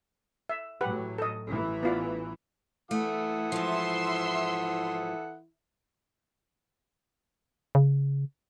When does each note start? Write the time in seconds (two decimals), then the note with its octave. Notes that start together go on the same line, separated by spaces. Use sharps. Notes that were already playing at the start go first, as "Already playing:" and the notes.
0.49 E5
0.81 A2 E3 F#3 G4 B4 F#5
1.18 A4 D#5
1.48 A1 E3
1.83 B3 F4 D5
2.91 E3 A3 E4 A4 F#5 D#6
3.52 G#2 F3 E5 C6 E6
7.75 C#3